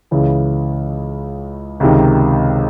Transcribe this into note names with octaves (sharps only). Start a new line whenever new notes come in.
C#2 C#3 E3
C#2 C3 D#3